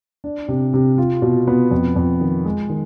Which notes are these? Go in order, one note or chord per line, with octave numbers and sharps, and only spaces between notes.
D4
C3
C3
F4
B2
B3
F2
F2
D#3
G#3
D#3